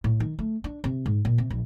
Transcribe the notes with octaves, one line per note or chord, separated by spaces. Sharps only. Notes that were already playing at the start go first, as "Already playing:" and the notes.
A2
D#3
A3
D4
C3
G#2
A#2
C3
A#1